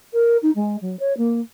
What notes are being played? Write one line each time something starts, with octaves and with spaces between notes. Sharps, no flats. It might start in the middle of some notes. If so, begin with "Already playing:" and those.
A#4
D#4
G#3
F#3
C#5
A#3